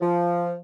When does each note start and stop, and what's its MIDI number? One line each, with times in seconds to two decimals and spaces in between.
0.01 0.57 53